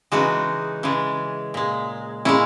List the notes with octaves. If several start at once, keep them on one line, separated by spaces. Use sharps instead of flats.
C#3 E3 G#3 D#4 F#4
C#3 E3 G#3
A#2 G#3
A#2 G#3 C#4 E4